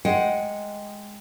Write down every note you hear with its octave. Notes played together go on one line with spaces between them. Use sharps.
G#3 F#5 G5